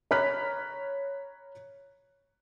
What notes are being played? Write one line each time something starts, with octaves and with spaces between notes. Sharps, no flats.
C#5 A#5 B5 F6 F#6 B6